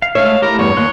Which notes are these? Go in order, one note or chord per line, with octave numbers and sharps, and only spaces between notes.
F5
G#3 A3 C#5 E5 F5
A3 E4 G4 A#4
E2 G2 C#5
D#2 C6 C#6 F#6